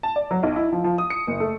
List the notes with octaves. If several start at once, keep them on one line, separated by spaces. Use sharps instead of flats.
A5
D5
F#3
B1
E4
F3
F3
D#6
C#7
F#1
A3